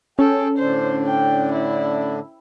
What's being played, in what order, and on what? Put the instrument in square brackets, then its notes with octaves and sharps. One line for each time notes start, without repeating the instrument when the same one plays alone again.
[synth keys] C#4 [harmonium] G#4 G5 [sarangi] A4
[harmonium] A2 D3 D4 [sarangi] C5
[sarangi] G5
E4